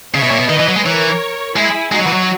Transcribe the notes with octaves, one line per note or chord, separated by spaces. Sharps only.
C#3 C#5 E5
B2
A#2
B2
D#3 B4 D#5
E3
F#3
G#3
E3 A#4 C#5
G#3 E4 G#4
G#3 D#4 F#4
F#3
E3
F#3